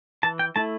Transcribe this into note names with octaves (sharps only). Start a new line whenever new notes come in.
E3 A5
G5
A3 E4 A5